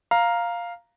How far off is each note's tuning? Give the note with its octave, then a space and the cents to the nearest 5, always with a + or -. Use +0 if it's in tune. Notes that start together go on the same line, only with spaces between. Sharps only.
F5 +0 A#5 +5